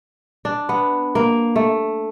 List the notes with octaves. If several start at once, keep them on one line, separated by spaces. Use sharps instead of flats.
D4
B3
A#3
A3